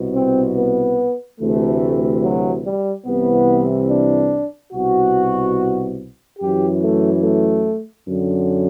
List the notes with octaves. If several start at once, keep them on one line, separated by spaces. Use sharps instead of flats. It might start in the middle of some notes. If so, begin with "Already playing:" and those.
Already playing: C2 B2
C4
B3
D2 C3 E3 A3
F#3
G3
C2 C3 E3 B3
D4
C2 B2 F#4
F#2 E3 G4
A3
A3
F#2 D3